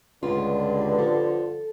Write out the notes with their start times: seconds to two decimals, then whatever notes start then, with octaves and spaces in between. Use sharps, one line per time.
0.23 C#2 G2 D3 F4
0.99 F3 A4